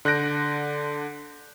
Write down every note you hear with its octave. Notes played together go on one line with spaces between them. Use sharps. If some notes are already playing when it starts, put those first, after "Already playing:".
D3 F#6 G6 A#6 D7